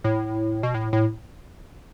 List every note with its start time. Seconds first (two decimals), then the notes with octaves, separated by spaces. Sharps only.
0.04 A2
0.63 B2
0.74 A2
0.93 A2